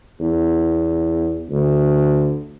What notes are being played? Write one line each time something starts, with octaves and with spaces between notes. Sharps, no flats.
E2
D2